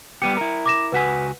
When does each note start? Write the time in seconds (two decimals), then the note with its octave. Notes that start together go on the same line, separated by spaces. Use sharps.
0.22 G3 B3 G4 C#7 D#7
0.37 E4 A#4
0.66 D6 A#6 E7
0.92 C#2 F#4 B4 F#5 G#5 B6